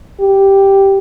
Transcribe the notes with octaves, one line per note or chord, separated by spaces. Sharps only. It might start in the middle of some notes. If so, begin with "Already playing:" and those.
G4